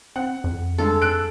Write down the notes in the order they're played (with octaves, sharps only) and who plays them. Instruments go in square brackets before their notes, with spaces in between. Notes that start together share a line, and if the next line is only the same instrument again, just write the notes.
[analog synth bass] C4 [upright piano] F#5
[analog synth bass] F2
[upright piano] G2 G#3 [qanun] A4
[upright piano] E6 F#6 D7